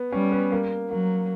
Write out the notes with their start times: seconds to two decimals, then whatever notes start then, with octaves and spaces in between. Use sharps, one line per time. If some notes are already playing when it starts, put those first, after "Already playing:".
Already playing: B3
0.12 G3 C#4
0.32 B3
0.52 A#3
0.90 F#3 A#3